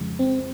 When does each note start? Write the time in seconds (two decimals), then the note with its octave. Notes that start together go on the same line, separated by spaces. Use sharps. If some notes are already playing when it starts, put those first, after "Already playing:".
Already playing: F2 C#3 F3 G#3
0.19 C4